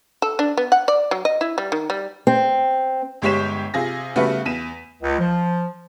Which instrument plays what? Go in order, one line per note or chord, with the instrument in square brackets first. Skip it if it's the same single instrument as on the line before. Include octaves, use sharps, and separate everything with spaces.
[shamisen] A4
D4
B3
F#5
D5
F#3
D#5
E4
G3
D#3
G3
[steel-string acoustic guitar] C4
[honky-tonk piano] G1 G#3 G4 C#5 B6 E7
C3 F4 G#4 A#6
C#3 G3 A3 B3 F#4 B4
E2 B6 D#7 E7
[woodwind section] C#2
F3